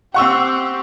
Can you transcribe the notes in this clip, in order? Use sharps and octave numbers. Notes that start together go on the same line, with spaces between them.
C4 G4 F#5 C#6 E6